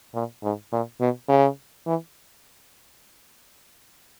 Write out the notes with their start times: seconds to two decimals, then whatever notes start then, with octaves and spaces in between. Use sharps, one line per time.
0.14 A#2
0.43 G#2
0.72 A#2
1.00 B2
1.29 C#3
1.87 E3